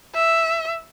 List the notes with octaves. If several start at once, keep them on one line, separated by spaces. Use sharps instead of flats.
E5